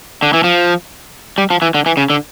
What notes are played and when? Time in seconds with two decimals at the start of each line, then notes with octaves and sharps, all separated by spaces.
0.23 D3
0.34 E3
0.44 F3
1.38 G3
1.50 F3
1.62 E3
1.74 D3
1.86 E3
1.97 C#3
2.10 D3